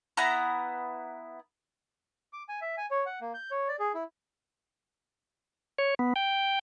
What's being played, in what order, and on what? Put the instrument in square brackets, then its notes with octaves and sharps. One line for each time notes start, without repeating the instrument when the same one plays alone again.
[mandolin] B3 E4 F#5 A#5
[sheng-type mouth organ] D6
G#5
E5
G#5
C#5
F#5
A#3
G6
C#5
D5
G#4
E4
[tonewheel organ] C#5
B3
G5